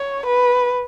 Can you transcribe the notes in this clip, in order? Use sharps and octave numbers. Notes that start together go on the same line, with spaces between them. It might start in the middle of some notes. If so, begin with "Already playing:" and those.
Already playing: C#5
B4